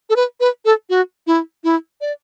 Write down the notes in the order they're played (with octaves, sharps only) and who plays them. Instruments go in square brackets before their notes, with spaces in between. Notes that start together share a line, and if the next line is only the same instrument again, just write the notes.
[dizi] A4
B4
B4
A4
F#4
E4
E4
D5